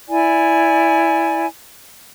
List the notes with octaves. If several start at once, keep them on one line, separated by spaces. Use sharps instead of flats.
E4 D5 G#5